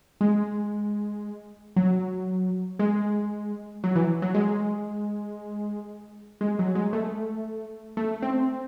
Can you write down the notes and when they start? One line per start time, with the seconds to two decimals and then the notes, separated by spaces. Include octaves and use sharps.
0.21 G#3
1.76 F#3
2.79 G#3
3.84 F#3
3.96 E3
4.22 F#3
4.34 G#3
6.41 G#3
6.59 F#3
6.75 G#3
6.93 A3
7.97 A3
8.22 C4